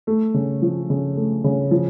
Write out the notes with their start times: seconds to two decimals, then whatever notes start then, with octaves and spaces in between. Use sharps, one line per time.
0.07 A3
0.34 C#3
0.62 F3
0.90 C#3
1.17 A3
1.44 C#3
1.71 F3